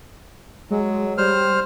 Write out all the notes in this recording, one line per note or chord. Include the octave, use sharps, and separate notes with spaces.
F#3 G#3
G3 C5 F6